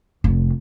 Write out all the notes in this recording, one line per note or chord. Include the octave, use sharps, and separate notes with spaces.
F1